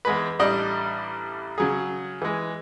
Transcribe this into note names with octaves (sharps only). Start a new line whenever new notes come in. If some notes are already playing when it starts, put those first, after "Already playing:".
E2 G#3 B4
A1 G3 D4 D5 D#5
C#3 F#3 G#4
E3 G#3